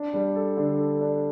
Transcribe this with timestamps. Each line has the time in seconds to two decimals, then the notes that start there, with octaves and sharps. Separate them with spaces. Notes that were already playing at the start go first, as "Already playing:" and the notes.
Already playing: D4
0.14 G3
0.35 A4
0.57 D3
0.78 A4
1.01 D4